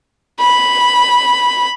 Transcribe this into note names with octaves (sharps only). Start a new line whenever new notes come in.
B5